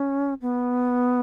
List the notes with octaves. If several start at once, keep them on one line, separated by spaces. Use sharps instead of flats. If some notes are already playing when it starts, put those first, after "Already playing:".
Already playing: C#4
B3